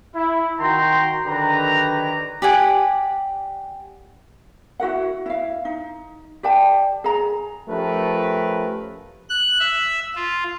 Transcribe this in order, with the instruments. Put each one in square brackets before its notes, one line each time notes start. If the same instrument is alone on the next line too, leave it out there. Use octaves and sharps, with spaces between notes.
[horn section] E4
D#3 F#4 G5 A#5 C6
D3 D#3 F#3 G4 B4 A#5
[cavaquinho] G4 D5 F#5 G#5
[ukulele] E4 F#4 A#4 F#5
E4 F5
D#4
G4 D5 G5 A5
G#4 A#5
[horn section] F3 A3 C#4 G4 A#4 B4
[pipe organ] F#6
E5
F4